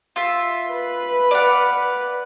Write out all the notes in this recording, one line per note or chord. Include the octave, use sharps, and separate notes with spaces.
F4 E5
B4
D5 F5 F#5